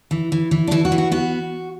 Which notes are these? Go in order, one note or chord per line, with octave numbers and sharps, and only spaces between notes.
E3
E3
E3
D4
E3 E4
F#4
E3
F#4
B3 F#4